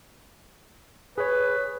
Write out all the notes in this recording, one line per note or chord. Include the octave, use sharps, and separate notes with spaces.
G#4 B4 C#5